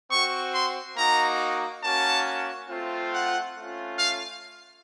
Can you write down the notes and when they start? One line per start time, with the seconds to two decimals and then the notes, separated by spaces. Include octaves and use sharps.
0.10 C4 F#4 C#6
0.54 C6
0.97 A#3 D#4 F#4 A#5
1.83 A#3 C#4 F#4 A5
2.69 A3 C4 F4
3.12 F#5
3.55 A3 C#4 F4
3.98 F5